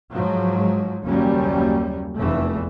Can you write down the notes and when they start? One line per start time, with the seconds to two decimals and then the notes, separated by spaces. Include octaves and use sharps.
0.13 G#2 F3 F#3
1.05 F#1 D#2 F#3 G3 C#4
2.17 F1 E2 E3 A3